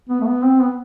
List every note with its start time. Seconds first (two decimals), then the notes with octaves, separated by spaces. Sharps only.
0.09 B3
0.21 A3
0.26 B3
0.44 C4
0.61 B3